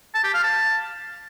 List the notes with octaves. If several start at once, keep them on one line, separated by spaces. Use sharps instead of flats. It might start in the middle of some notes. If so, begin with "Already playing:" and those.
A5
G4
F5
A5